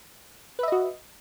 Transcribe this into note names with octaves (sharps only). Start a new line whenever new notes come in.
F#4 B4 D#5 E5